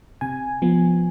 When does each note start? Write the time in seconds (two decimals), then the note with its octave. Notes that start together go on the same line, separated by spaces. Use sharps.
0.21 C3 G#5
0.62 F3 B3